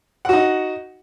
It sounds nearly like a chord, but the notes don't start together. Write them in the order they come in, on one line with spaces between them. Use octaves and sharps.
F#5 F#4 D#4